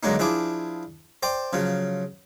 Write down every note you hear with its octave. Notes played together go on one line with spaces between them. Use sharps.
D3 F#3 G#3 A#3 D#4
F3 D4 E4 G#4 D6
C5 D5 G5
C#3 F3 F#3